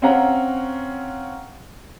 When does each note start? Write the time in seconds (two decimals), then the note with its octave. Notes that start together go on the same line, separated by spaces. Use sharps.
0.02 C4 C#4 F5 F#5 A#5